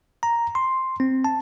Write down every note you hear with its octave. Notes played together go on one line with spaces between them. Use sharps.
A#5
C6
C4
A5